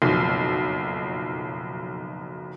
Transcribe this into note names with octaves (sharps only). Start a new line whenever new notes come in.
F#1 B1 F2